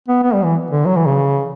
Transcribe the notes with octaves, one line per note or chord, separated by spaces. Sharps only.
B3
B3
G3
E3
D3
F#3
E3
C#3